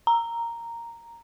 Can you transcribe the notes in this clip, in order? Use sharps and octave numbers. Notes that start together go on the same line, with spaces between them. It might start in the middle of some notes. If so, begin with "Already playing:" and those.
A#5